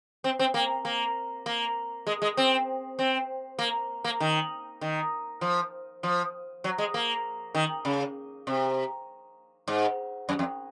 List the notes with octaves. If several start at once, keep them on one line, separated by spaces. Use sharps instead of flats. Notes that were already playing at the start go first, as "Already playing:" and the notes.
C4
C4
A#3
A#3
A#3
G#3
G#3
C4
C4
A#3
A#3
D#3
D#3
F3
F3
F#3
G#3
A#3
D#3
C#3
C3
G#2
F#2
F2